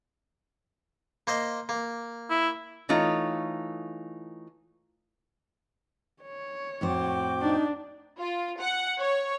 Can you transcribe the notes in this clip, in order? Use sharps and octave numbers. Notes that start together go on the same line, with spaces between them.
A#3 C5 D#5
A#3
E4
E3 A3 D#4 F4 C#5
C#5
F2 A2 F#4 C5 G5 D6
D4 D#4
F4
F#5
C#5